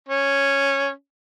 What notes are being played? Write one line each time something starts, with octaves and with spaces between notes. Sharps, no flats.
C#4